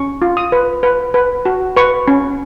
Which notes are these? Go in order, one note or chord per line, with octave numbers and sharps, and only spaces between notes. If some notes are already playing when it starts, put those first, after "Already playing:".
Already playing: C#4 C#6
F4
D#6
B4
B4
B4
F#4
B4 C#6
C#4